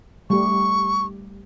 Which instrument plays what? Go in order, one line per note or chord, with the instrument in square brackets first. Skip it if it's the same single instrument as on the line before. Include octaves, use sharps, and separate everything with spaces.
[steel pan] G3 A3 G4 [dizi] C#6